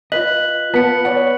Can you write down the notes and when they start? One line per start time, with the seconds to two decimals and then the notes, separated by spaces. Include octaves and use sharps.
0.12 F4 B4 D#5 F#6 B6 F#7
0.74 B3 F4 A5 B6 C#7
1.05 C#5 D5 F#5